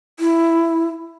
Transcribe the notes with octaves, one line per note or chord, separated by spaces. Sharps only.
E4